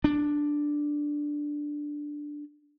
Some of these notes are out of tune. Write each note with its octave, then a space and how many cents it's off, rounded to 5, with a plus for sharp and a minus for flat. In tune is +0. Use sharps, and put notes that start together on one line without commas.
D4 +0